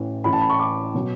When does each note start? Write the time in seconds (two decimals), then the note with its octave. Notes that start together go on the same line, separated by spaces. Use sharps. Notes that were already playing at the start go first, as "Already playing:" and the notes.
Already playing: A1 A2 E3
0.24 A1 A2 E3 B5
0.33 A5
0.41 B5
0.50 C#6
0.59 D6
0.95 B2 F#3